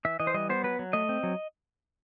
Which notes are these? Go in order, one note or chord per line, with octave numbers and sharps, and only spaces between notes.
E3 E5
E3 D#5
C5
G3 D#5
B3 C5
F#3 B4
F#3
A3 D#5
C4
F#3